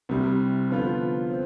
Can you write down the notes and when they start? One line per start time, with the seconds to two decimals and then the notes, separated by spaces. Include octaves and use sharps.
0.09 C2 C3 G3
0.70 D3 F3 B3 F4 C5
1.30 C4